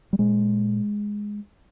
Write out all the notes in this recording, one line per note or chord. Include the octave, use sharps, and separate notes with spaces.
G3
A#2 G#3